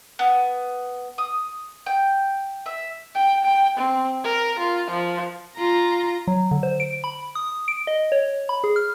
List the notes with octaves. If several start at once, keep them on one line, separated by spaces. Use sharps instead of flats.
B3
D#6
G5
E5
G5
G5
C4
A#4
F4
F3
F4 A#5
F#3
D3
C5
D7
B5
D#6
D7
D#5
C#5
B5
G#4
F6